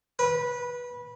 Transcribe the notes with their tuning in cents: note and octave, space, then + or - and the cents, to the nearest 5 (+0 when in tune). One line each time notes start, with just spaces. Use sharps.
B4 -20